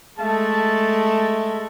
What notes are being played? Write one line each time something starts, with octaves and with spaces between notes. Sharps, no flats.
G#3 A3 E5 A5